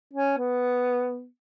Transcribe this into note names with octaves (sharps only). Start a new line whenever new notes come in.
C#4
B3